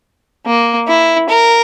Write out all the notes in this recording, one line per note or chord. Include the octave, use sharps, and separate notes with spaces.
A#3
E4
A#4